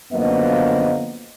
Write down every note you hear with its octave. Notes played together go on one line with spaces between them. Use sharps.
F#2 D3 F3 A#3 B3 D#5